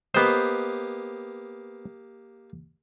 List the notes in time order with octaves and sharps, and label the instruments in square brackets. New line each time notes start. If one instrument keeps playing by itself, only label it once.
[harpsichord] A#3 G4 D#5 [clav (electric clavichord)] B3 C5